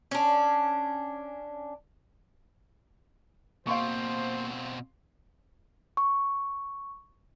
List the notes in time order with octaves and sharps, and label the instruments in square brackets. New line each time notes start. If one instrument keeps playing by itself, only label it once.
[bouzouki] C#4 D4
[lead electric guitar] B2 C4 [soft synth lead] A#3 [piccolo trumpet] C5 [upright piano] F5 C6 C#6
[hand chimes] C#6